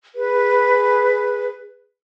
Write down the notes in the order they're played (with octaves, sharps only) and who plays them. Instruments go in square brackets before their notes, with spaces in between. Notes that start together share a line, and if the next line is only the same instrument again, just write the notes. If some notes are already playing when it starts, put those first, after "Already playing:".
[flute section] G#4 B4